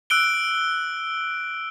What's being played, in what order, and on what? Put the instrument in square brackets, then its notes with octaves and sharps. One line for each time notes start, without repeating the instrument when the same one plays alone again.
[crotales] E6 F#6 D7 G7